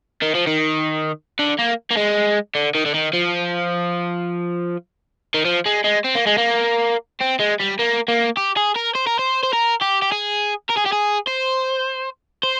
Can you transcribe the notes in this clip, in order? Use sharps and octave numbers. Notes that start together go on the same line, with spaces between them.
D#3
F3
D#3
D3
A#3
A#3
G#3
D3
D#3
D3
D#3
F3
D#3
F3
G#3
G#3
C4
A#3
G#3
A#3
C4
G#3
G3
A#3
A#3
G4
G#4
A#4
C5
A#4
C5
C5
A#4
G4
G4
G#4
A#4
G#4
G4
G#4
C5
C5